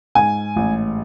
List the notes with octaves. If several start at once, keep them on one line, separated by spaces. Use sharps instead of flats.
G#2 G#5
A1